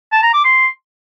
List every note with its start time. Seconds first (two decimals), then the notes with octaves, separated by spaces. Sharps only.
0.12 A5
0.23 A#5
0.34 D6
0.44 C6